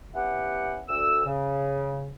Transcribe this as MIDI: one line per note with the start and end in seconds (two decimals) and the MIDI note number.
0.14 0.81 59
0.14 0.81 61
0.14 0.81 64
0.14 0.81 67
0.14 0.81 78
0.89 1.24 38
0.89 1.24 88
1.26 2.13 49